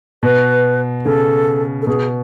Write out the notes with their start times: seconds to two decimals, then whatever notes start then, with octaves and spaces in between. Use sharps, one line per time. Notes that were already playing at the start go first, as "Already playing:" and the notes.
0.23 B2 B4
1.05 C#3 A4
1.82 A4
1.87 B2 G#4